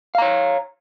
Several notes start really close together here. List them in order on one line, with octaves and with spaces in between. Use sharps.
F5 A#5 C#5